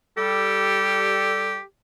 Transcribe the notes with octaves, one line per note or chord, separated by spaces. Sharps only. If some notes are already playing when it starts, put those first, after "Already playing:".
G3 G4 A4